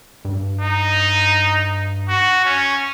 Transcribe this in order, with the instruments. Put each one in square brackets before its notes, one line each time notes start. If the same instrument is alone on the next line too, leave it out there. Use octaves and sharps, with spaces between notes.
[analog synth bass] G2
[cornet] D#4
F#4
C#4